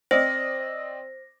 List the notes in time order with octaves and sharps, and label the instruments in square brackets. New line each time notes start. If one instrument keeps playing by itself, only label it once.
[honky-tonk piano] C4 D5 D#5 [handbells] C5 [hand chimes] A#6